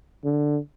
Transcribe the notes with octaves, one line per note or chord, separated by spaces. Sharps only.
D3